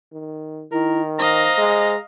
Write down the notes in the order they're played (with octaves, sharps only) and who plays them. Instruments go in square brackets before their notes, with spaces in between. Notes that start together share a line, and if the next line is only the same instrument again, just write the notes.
[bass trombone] D#3
[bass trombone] D#3 [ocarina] E4 [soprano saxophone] A#4
[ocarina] C5 [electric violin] D#5 F5 [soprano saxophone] A#5
[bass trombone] G#3